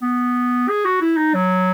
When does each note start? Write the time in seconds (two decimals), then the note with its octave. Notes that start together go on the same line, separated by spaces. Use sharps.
0.02 B3
0.69 G#4
0.85 F#4
1.01 E4
1.17 D#4
1.34 F#3